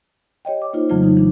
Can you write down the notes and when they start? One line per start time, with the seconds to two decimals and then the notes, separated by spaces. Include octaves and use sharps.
0.45 G4 C#5 D#5 G5
0.62 D6
0.73 A#3 D#4 F4 C5
0.89 F2 C#3 E3 F#3 A3 F4
1.03 D#4
1.17 E3 D4